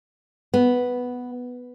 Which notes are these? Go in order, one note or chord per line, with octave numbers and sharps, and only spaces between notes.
B3